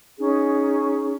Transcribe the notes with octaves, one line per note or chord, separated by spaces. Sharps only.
C#4 D#4 G#4